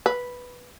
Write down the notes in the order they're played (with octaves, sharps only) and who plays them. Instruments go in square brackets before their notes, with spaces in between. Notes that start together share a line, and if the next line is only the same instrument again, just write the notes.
[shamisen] B4